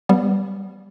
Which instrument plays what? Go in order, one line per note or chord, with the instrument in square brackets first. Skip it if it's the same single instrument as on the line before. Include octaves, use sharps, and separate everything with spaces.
[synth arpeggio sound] G3 B3